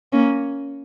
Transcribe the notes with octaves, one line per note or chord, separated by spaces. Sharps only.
A#3 C#4